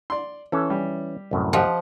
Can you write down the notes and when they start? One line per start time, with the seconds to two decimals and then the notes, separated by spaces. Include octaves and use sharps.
0.10 D5 C6
0.52 E3 C#4 A4
0.70 G3
1.31 C2 F#2 A2
1.53 F3 G4 D#5 F#5